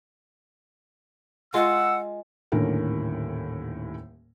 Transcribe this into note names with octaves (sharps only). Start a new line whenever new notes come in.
G#3 F4 F#5 E6
D#1 D#2 A2 D3 C#4 A#4